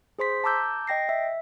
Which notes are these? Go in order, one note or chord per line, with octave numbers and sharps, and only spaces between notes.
G#4 C5 C6 B6
A5 A#5 D6 E6 G6
D#5 G5 A#6 C7
E5